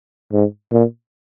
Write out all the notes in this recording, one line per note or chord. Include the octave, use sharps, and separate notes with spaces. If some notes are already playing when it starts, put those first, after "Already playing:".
G#2
A#2